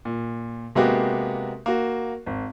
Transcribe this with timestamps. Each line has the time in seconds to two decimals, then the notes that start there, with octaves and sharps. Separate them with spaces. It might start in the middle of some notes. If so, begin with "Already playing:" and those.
0.05 A#2
0.75 C3 G#3 A#3 B3 F#4 G4
1.66 A#3 F#4
2.26 G#1